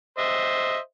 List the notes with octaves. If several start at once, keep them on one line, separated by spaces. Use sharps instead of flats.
C5 D#5 E5